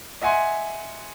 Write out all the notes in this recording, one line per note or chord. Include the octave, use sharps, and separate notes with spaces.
D#5 E5 F#5 G#5 C6